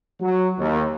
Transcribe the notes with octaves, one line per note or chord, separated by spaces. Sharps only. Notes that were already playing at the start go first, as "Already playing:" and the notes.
F#3
D#2